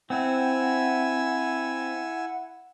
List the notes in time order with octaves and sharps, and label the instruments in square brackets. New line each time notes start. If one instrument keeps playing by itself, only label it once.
[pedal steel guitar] C4 [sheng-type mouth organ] E4 G#5 E6 [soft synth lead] F#5